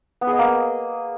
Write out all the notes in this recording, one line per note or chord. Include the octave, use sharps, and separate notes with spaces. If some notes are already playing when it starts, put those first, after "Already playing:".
B3
G#4
D#5
A#3